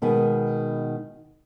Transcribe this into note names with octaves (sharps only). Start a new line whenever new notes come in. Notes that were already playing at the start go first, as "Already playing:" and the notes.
B2 D#3 G#3 B3